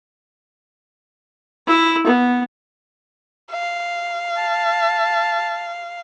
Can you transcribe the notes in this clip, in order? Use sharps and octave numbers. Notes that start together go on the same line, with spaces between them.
E4
B3
F5
A5